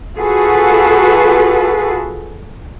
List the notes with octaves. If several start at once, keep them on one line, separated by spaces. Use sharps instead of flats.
F4 F#4 G#4 A4 B4